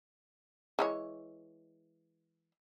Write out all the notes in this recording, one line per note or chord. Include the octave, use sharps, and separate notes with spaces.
E3 G#3 C#5